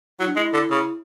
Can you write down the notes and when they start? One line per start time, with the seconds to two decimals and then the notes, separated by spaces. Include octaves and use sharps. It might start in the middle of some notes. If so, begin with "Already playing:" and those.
0.20 F#3 E4
0.27 D4
0.36 G#3 E4
0.53 D3
0.71 C#3